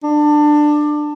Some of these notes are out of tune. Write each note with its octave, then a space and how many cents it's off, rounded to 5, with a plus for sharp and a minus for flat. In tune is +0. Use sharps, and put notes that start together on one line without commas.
D4 +20